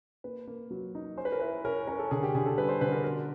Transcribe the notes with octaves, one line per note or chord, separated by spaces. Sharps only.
A#3 B4
A#3
F#3
D#4
C#4 C5
B4
A#4
E4 B4
C#4 A#4
C#4 A#4
A4
D3 G#4
G4
D3 G#4
A4
G3 B4
C5
D3 B4
A#4
B2 A#4